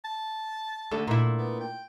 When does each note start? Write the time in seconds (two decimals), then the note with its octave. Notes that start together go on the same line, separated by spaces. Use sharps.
0.05 A5
0.91 D2 D3 A4
1.07 A#2 E4
1.38 B3
1.61 G5